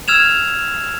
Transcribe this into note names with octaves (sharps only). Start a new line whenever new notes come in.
E6 F6 G#6 E7 F7